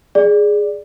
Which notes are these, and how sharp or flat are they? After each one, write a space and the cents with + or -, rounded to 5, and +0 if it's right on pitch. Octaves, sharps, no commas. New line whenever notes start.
G#4 +0 D5 +0